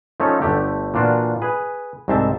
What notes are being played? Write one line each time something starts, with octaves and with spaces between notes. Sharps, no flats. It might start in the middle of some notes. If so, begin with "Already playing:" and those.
F3 A3 C#4 D#4 A4 C#5
G1 D3 A3 G4
A#2 E3 D4 F4 F#4
G#4 B4
C2 G#2 C4 C5 E5 A5